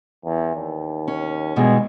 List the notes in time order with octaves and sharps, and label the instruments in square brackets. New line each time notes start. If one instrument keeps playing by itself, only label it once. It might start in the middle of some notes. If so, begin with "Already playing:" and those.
[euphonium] E2
D#2
[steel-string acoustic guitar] C#4
[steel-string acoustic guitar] G2 B2 E3 [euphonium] G#3